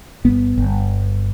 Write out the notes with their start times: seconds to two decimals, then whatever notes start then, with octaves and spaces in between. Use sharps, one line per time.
0.24 G1 B3
0.57 G1